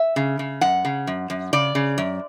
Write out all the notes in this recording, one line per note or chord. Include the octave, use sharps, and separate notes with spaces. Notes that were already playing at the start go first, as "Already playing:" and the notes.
Already playing: E5
C#3
C#3
F#2 F#5
C#3
F#2
F#2
C#3 D5
C#3
F#2